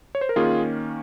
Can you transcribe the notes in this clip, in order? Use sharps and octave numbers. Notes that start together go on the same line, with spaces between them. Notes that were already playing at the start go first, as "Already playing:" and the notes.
C#5
C5
A#4
D#3 A#3 C#4 F4 G#4